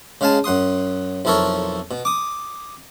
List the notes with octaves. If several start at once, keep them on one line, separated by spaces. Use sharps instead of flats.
C#3 G#3 F5 G#5 A5
F#2 F#5 C6 D#6
B1 F2 E4 A4 A#4 C#5
B2
D6 D#6